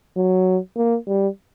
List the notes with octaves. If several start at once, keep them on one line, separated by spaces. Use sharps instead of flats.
F#3
A#3
G3